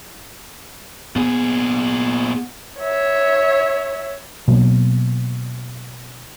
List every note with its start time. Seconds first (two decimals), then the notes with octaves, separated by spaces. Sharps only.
1.16 A#2 B3 G#4
2.81 C#5 E5
4.48 B2 F#3 A#3